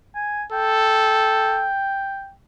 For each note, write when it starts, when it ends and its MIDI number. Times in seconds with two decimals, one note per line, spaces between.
0.15 0.43 80
0.52 1.69 69
0.52 2.31 79